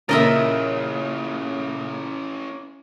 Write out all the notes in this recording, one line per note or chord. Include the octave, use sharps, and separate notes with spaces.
A#2 C#3 C#4 E4 A#4 D#5 E5 A6